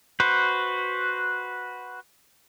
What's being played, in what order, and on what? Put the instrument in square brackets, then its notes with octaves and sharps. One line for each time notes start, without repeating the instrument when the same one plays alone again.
[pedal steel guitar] F#4 B4 C5